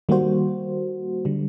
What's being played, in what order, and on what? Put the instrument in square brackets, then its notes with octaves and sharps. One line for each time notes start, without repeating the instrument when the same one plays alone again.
[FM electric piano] D#3 G3 A#3 F#4 C5
D3 G3